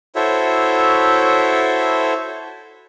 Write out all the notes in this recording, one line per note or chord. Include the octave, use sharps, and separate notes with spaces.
E4 F#4 A4 C5 C#5 E5